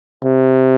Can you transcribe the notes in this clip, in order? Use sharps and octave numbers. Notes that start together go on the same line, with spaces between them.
C3